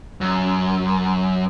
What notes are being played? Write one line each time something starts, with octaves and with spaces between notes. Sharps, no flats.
F#2